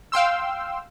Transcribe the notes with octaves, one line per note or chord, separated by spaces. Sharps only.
F5 G5 C6 E6